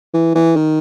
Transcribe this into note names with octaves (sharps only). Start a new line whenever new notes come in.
E3
E3
D#3